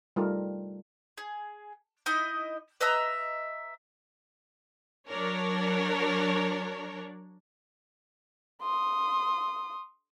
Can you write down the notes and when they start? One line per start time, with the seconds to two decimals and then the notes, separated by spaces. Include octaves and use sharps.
0.16 G3 A3 D#4 F4 A4 A#4
1.18 G#4
2.06 D#4 E4 D#5
2.81 B4 D#5 E5 A#5
5.09 F#3 D4 A#4 C#5
8.62 C6 D#6